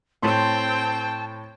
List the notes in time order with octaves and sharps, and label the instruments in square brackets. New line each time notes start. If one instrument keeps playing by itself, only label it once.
[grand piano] A2 C6 [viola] C4 G5 [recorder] A5